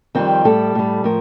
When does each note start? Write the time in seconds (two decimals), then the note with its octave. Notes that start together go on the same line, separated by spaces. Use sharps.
0.15 F2 D#3 G3 C4
0.45 A2 G3 A4
0.75 A2 G3
1.04 A2 F3 A#4